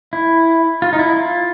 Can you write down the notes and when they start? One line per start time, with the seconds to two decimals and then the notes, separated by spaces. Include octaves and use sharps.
0.13 E4
0.82 F4
0.93 D#4
0.99 E4
1.16 F4